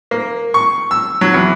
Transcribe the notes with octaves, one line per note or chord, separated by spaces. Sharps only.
A#3
C#6
E6
F#3
E2